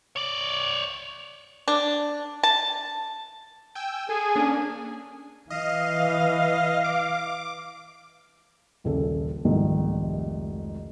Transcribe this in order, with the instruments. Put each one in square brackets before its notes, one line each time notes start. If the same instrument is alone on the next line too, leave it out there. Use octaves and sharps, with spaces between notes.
[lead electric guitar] C#5 D5
[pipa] D4
A5
[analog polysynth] G5 G#5 E6
[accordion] G#4 G#5 [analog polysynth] A4
[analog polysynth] A#3 C#4 D4
[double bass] E3 [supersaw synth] D#5 [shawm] F5
[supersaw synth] D6
[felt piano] D#1 A#1 C#3 A4
F1 C2 F2 G#2 D#3